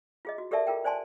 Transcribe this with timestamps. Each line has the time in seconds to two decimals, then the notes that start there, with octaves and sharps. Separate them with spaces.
0.25 F4 G#4 D#5
0.38 F#4
0.51 G4 A4 A#4 D5 E5 A5
0.67 F4 G#4 A#4 G5
0.84 C5 D5 G#5 A5 C6